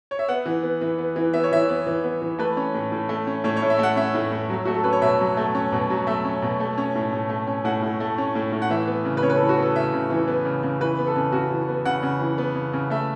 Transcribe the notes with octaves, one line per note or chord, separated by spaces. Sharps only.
C#5
E5
B3 F#5
E3
B3
E3
B3
E3
B3 E5
C#5
E3 E5
B3
E3
B3
E3
A3 B4
C#4
A2
A2
A3
C#4
A2 C#5
C#5
A2
E5
A3 F#5
C#4 E5
A2
A2
F#3
A3 F#4
A4
C#4 B4
C#5
B2 E5
F#3
A3
C#4
B2
F#3
A3 E5
C#4
B2
A3
C#4
A2
A2
A3
C#4
A2 F#5
A2
A3
C#4
A2
A2
F#5
E3 E5
B3
C#3
B4
C#3 C#5
B4
E3 A4
F#4
B3 A4
C#3 E5
C#3
E3
B3
C#3
C#3
E3 B4
B3
A4
C#3
C#3 F#4
E3
B3
C#3 F#5
C#3
E3
B3
C#3
C#3
A3 E5